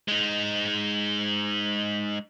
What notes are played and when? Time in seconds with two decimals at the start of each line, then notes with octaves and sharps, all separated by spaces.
0.08 G#3 D#4